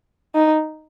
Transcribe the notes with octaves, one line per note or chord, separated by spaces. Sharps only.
D#4